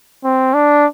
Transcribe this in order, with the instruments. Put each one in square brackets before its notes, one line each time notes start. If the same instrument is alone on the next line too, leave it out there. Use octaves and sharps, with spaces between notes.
[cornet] C4
D4